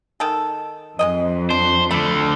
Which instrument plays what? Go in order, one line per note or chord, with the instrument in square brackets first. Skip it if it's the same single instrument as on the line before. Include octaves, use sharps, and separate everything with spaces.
[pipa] D#3 G#3 A4
[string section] F2 [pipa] G#3 A#3 D#5
[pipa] D4 [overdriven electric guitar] C5
[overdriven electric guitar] D3 A3 [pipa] B5